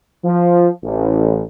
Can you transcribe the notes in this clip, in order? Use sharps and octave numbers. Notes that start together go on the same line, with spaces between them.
F3
A1